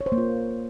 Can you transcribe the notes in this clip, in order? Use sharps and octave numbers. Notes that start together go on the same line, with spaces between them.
C#5
C5
A#3
F4